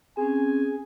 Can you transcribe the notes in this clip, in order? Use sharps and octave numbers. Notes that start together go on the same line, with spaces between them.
C4 C#4 G#4 G#5